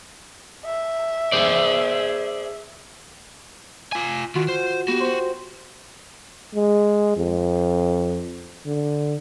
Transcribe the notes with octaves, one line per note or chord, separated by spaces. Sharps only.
E5
G#4 C5 D5
F4 G#5
D#3 F4 F#4
C5
B3 F#4 G4
C5
G#3
F2
D3